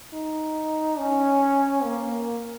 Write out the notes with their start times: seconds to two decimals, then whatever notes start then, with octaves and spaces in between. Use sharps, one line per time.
0.13 D#4
0.99 C#4
1.84 A#3